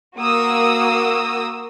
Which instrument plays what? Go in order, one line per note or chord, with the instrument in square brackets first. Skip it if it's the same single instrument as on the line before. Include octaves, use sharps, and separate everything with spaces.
[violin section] A#3 F#4 A#4 D#6 E6